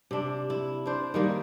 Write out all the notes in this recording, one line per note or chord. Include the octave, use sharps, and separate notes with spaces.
C3 D4
E4
D4 C5
D#3 G3 A#3